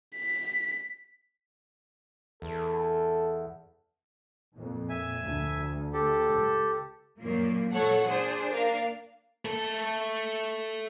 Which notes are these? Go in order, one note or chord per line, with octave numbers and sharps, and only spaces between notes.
B6
E2 A4
F2 A#2
E5 G#5
D2
G4 A4
C#2
F#2 A#2 A#3
A#2 F#3 A4 C#5 F#5
D4 G#4 C5
A#3 A#4 F5
A3 A4